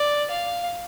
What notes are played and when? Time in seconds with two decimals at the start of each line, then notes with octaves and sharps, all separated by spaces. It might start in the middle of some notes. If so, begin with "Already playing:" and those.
Already playing: D5
0.31 F5